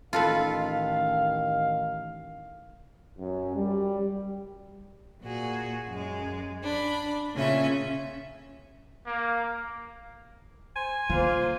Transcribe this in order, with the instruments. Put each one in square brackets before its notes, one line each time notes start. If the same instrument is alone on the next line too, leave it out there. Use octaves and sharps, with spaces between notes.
[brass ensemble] A1 D#3 F5 [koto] F4 A4 B4
[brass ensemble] F#2
G3
[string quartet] A#2 F#4 G#4
F#2 G#3
D4 B5
A#2 C#3 C#4 F4 E5
[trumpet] A#3
[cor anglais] C5 [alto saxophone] G#5
[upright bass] D3 [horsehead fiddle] A#3 C5 [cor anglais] F4